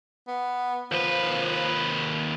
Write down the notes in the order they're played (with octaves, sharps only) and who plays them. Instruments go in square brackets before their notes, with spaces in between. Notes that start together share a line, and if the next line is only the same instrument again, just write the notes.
[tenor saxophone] B3
[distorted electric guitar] D#2 B4 [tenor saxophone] F3